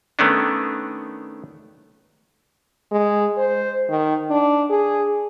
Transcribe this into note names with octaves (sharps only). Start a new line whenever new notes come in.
D#3 A3 B3 C#4 D4
G#3
C5
D#3
D4
G#4